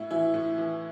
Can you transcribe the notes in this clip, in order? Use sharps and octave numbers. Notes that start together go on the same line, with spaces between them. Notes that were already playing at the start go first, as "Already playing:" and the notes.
Already playing: A2 E4
E3 E4
A2
E3